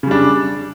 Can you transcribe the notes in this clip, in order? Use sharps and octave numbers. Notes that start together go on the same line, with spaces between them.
C#3 G3 D4